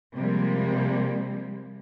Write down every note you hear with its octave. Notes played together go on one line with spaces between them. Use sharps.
C3 F3 G3 G#3 A#3